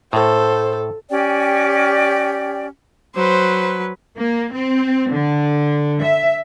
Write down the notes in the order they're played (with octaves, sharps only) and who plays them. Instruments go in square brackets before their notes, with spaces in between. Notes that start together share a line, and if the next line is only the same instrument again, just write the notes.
[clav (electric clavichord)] A2 [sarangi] A4 [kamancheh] C5
[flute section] C#4 G4 D5 G5
[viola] F#3 B4 [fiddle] C5
[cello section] A#3
C4
D3
E5